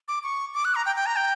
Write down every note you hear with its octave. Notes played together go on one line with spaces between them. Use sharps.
D6
C#6
D6
F#6
A#5
G5
G5
A#5
G5